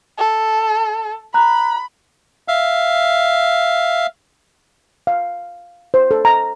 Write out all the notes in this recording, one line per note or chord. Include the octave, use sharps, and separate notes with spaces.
A4
A#5 B5 F#6
E5 F5
F5
C5
A4
A#5